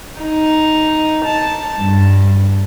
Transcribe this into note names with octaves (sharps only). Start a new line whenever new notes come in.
D#4
A5
G2